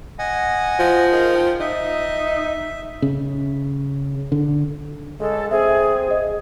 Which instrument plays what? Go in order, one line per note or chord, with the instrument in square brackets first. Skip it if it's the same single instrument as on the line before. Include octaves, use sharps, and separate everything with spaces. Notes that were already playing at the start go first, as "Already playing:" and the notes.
[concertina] D#5 F#5 G#5
[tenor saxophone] F3
[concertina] D#4 G#4 A#4
G5
[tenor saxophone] D#4 [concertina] E5
[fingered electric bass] C#3
D3
[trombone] G#3 [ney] A4
[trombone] C4 [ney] G#4 [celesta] E5
[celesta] G#4 D#5